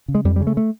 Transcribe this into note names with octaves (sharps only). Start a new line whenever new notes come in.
C#3
G#3
F2 G3
C#3 G3
A3
A3